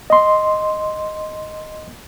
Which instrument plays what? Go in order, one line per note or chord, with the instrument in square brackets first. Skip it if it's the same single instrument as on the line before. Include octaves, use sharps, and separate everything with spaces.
[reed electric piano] D#5 C6